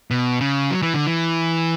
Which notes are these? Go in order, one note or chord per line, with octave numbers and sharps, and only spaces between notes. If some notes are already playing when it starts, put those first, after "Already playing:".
B2
C#3
F#3
E3
D3
E3